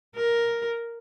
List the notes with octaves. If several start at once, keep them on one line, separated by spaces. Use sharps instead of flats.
A#4